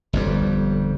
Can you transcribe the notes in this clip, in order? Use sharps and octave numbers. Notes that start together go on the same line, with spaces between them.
G1 F2 G3